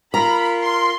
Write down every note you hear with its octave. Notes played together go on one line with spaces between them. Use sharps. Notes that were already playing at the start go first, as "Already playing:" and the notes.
F4 A#4 A#5 B5
C6